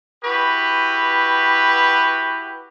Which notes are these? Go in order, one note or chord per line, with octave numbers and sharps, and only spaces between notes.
E4 F#4 G4 B4